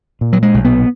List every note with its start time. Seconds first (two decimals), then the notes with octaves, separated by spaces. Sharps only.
0.21 A#2
0.33 F#3
0.43 G#3
0.54 B1
0.64 B3